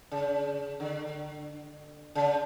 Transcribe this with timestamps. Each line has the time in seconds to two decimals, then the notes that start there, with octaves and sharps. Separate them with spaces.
0.12 C#3
0.80 D3
2.15 C#3